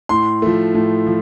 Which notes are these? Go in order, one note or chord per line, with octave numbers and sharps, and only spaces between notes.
A2 C6
F3 A3
A2
F3